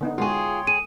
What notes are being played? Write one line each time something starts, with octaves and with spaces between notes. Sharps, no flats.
D3 B3 D#4
G#3 F4 F#4 G#4 C#5 G5 C6
G#4 D#7